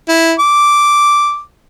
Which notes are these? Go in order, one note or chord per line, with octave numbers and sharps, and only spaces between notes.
E4
D6